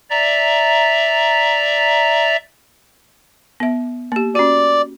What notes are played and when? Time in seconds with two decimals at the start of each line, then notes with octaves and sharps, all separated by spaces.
0.10 D5 E5 A#5
3.60 B3 E5
4.12 A#3 G4
4.35 C#4 F#4 D5